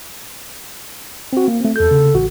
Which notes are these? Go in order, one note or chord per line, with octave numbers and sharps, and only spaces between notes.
C4 F#4
A#3
A3 C4
E2 A4 G6
C#3
A1 F#4